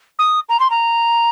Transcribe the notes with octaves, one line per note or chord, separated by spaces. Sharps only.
D#6
A#5
C6
A#5